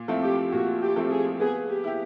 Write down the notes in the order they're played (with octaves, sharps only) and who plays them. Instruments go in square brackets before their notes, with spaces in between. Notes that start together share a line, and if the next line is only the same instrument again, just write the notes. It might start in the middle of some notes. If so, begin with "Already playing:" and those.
Already playing: [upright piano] A#2
F3 A3 C4 E4
[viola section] G4
[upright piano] A#2 [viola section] F#4
[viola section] G4
[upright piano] F3 A3 C4 E4
[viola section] G#4
[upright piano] B3 [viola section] G#4
[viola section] G4
[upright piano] E4 G4